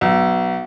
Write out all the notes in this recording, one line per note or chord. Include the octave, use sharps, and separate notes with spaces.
B1